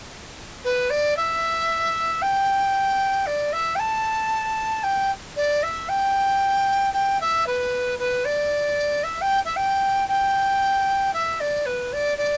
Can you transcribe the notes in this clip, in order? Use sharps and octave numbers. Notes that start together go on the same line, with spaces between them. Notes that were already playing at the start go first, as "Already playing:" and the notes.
B4
D5
E5
G5
D5
E5
G5
A5
G5
D5
E5
G5
G5
E5
B4
B4
D5
E5
G5
E5
G5
G5
E5
D5
B4
D5
D5